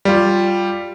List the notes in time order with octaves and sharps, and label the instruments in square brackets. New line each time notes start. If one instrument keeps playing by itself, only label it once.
[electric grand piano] G3 F4